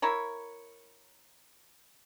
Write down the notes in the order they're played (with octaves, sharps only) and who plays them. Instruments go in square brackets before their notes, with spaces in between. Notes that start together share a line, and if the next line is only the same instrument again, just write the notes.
[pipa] E4 A#4 C#5